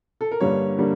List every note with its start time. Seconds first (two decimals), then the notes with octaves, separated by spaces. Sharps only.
0.21 A4
0.31 A#4
0.40 G2 D3 G3 A#3 C#5
0.79 D3 G3 A#3